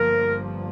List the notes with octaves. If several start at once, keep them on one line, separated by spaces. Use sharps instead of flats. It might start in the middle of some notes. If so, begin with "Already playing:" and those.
Already playing: G1 G2 F3 A#3 A#4